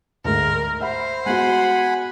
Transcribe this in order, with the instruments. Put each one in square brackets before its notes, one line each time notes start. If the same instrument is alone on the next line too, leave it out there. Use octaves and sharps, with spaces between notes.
[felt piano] D2 G#2 [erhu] A#4
[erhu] C5 [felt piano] E5 F#5 B5
[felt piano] G#3 B3 F#4 [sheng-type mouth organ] F#5 G#5 B5